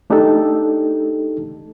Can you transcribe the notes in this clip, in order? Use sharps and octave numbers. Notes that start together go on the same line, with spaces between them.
A3 D4 D#4 G4 A4